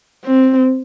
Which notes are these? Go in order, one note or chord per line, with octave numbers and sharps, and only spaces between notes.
C4